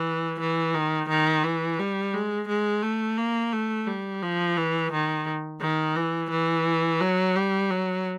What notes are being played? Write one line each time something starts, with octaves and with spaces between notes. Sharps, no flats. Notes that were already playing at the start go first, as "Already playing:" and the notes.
Already playing: E3
E3
D#3
D#3
E3
G3
G#3
G#3
A3
A#3
A3
G3
F3
E3
D#3
D#3
E3
E3
F#3
G3
F#3